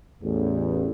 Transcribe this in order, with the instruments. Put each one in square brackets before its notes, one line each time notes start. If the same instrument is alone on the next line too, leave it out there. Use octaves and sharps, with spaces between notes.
[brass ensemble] A1 E2